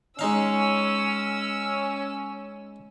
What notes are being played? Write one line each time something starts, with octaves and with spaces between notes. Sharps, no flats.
G#3 C#4 D#4 F5 E6